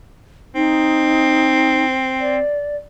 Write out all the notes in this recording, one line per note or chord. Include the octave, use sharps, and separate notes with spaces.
C4 D#4
D5